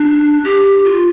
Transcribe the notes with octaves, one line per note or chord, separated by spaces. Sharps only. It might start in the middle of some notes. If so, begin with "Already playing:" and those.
Already playing: D4
G4
F4